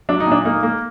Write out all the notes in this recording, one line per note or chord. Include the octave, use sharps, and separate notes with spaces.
F#3 D4
D#4
A#2 D4
A#3 D#4
A#3